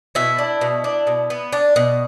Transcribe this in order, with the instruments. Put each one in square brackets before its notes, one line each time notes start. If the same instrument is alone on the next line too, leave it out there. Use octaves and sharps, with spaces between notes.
[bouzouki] B2 E4
D4
B2
D4
B2
B3
D4
B2